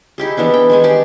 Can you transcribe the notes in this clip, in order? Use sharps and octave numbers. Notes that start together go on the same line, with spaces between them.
D#4 E4 G4 G#4
E3 B3 D4 E4
G5
D#3 G#3 G#5
D4 G4 G#4 D5